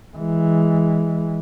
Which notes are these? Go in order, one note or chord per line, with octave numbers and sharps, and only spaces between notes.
E3 G#3